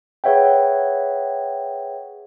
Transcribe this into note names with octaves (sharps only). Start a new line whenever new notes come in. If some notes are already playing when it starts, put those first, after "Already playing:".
G#4 B4 C#5 E5 F#5 G5